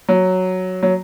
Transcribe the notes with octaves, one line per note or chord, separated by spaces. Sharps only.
F#3
F#3